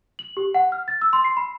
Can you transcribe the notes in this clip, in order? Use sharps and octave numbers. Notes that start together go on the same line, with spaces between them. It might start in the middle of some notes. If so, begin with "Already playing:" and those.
F#7
G4
F#5
F6
A6
E6
C6
C7
B5